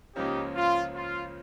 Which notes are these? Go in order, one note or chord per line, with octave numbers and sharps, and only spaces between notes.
C#2 C#3 F3 A#3 C#4 D#4 G4
F4
F4